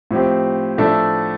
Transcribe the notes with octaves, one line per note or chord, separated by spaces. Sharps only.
A2 F3 C4 G4
A2 F3 A3 D4 A4